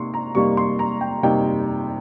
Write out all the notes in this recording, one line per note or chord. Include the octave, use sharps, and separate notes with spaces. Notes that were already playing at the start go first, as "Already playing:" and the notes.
Already playing: C3 A#3 D#4 C6 C#6
A#5
C3 G3 A#3 D#4 C#6
C6
A#5
G5
C3 G3 A#3 D#4 G5